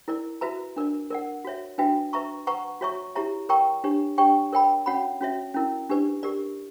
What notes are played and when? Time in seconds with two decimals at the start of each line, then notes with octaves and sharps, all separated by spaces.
0.08 E4 A#4 D5
0.41 F#4 B4 E5 A#5
0.76 D4 A#4 D5
1.11 A#4 D5 F#5
1.45 F#4 C#5 E5
1.78 D4 F#4 B4 E5 G5
2.13 B4 E5 A#5 C#6
2.47 B4 F#5 A#5 C#6
2.81 F#4 C#5 E5 A#5 C#6
3.15 E4 G4 C#5 E5 A#5
3.49 A#4 C#5 G5 A#5 C#6
3.84 D4 G4 C#5
4.18 D4 G4 C#5 G5 C#6
4.53 A#4 C#5 G5 B5
4.86 C#4 F#4 C#5 F#5 B5
5.21 C#4 F#4 C#5 E5
5.54 C#4 E4 A#4
5.89 D4 G4 B4 D5
6.23 G4 A#4 D5